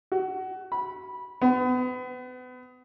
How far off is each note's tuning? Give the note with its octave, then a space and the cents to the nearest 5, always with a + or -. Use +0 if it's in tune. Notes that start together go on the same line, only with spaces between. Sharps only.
F#4 +25
B5 -15
B3 +35